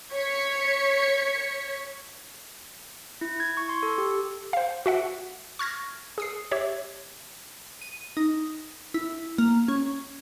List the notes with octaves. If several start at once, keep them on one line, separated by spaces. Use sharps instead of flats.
C#5 C#6 G#6 B6 C#7
E4
G#6
C#6
C6
A4
G4
C5 F5
F#4 E5 F#5
C#6 F6 G#6 A#6
G#4 D#6 C7
G4 C#5 E5
D#7
D#4
E4
A#3
C#4